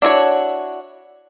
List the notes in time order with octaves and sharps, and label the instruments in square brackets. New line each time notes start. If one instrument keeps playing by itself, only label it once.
[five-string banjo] D4 E4 F#4 C#5